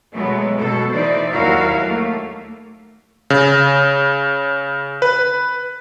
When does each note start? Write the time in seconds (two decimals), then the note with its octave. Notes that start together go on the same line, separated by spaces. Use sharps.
0.14 B2 F#3 G#3 A3 B3
0.57 B2 A4
0.93 E3 D#4 C5 D5
1.32 D#2 F#3 E4 F#4 A#4 F5
1.81 A3 A#3
3.30 C#3
5.02 B4